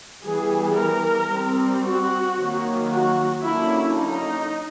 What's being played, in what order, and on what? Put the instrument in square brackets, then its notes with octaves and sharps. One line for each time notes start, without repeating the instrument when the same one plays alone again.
[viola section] E3 G3 B3 G#4
A#4
G3 C4
F#4
D#3 F#3 A#3
F#4
D3 F#3 A#3 C#4 E4
D#4